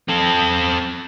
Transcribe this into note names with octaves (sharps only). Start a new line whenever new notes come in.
C4 A4